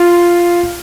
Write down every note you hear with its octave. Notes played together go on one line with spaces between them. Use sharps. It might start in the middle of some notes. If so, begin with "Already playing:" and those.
Already playing: F4